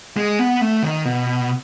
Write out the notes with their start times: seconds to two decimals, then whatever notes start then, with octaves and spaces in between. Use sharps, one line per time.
0.17 G#3
0.39 B3
0.61 A3
0.83 D#3
1.05 B2